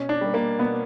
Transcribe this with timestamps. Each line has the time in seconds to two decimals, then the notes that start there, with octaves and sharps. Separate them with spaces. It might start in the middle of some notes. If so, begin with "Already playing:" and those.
Already playing: B2 C#4
0.09 D4
0.21 G3 A#3
0.34 A#3
0.58 B2 B3